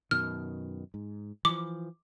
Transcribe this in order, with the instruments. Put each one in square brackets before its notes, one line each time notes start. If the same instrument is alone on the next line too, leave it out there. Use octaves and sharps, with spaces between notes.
[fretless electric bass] F#2 B2 D#3 [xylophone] F6
[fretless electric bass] G#2
[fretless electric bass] E3 F3 [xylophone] D6